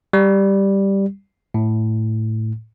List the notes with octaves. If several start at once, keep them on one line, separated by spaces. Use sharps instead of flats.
G3
A2